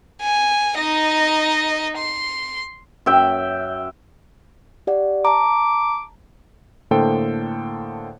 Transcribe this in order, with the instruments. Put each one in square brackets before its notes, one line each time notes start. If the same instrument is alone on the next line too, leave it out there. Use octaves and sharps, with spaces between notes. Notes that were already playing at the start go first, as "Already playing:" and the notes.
[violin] G#5
D#4 D#5
C6
[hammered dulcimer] F#2 E5 G5
[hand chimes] G4 D5 F#5
[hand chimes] A5 A#5 [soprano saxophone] D6
[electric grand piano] A2 D3 A#3 A4 C5 G5